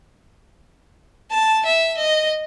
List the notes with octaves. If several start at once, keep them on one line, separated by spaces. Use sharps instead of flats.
A5
E5
D#5